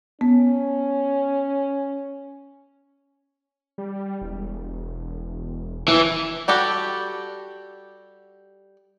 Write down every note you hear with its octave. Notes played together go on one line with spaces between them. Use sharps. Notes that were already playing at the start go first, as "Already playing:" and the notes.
B3 C#4
G3
E1
A#2 E3
G3 F#4 G4 A4